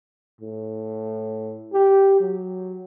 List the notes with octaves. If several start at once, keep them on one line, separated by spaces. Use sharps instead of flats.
A2
G4
F#3